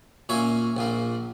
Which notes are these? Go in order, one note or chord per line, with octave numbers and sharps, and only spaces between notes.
A#2 A#3 C#4 C#5 E5
A#1 A#2 A#3